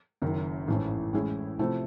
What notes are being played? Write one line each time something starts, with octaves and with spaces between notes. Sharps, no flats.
F#1 F#2 D#3
A1 G#2 E3 A3 C#4
A2 E3 G#3 C#4 E4
C3 F3 A3 C4 E4